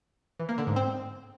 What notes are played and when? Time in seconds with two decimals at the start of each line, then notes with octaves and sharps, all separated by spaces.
0.40 E3
0.49 A#3
0.58 D3
0.67 G#2
0.76 C4